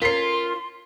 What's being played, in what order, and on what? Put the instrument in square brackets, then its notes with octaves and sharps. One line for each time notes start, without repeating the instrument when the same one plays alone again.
[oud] C#4 A#4 [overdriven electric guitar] F4 [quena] C6 [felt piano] B6 C7